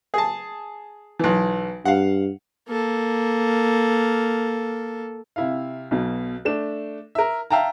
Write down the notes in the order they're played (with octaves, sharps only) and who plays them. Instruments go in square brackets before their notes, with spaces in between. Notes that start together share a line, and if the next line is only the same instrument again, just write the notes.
[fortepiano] G#4 A5
B1 E3
[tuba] G2 [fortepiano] F5 F#5
[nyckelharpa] A#3 A4
[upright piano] C3 E4 F5
B1 B2
A3 D4 E7
A#4 E5
E5 F5 G5 A5 A#5